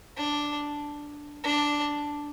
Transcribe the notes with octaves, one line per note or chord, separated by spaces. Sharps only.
D4
D4